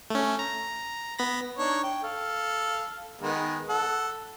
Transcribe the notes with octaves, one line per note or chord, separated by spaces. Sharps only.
A3 C#4
A#5
B3 B5 A#6
D4 D#4 C#5
G5
A4 F5
D#3 G#3 B3
A4 F#5